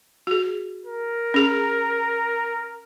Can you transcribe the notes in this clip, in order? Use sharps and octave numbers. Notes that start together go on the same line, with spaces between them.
F#4 G#4
A#4
C#4 G#4